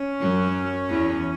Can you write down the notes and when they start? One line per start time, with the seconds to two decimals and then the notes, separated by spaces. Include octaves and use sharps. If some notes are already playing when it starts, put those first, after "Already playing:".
Already playing: C#4
0.21 F#2 F#3
0.89 E2 E3